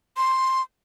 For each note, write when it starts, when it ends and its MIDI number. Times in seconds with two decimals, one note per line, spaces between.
0.17 0.62 84